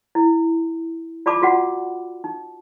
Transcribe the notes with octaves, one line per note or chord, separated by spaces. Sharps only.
E4
F4 D5 A5 B5 D6
F4 F#4 F#5
D#4